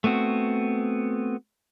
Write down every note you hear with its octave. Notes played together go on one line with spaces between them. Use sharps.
A3 B3 C4 F#4